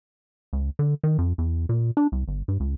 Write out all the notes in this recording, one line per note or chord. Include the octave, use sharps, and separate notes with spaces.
C#2
D3
D#3
F2
E2
A#2
D4
C2
G1
G2
C#2